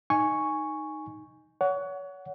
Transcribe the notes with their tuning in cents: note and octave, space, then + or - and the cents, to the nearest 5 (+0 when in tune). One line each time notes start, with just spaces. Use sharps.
D#4 -5 G#5 +0 C#6 +0
C#5 +30 F#5 +0